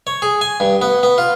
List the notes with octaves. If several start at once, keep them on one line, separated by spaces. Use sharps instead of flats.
C#5
G#4
G#5
G2
B3
B3
F4